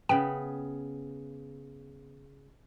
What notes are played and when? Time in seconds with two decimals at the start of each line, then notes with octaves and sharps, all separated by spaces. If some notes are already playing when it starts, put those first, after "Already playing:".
0.09 C#3 B3 G5